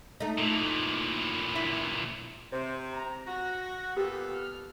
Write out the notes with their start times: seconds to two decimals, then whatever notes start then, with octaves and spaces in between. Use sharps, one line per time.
0.20 A3 D#4
0.38 A#2 E3
1.55 E4
2.52 C3 C5
2.93 A#5
3.26 F#4 A#6
3.97 A#2 B3 G4 A4
4.34 F6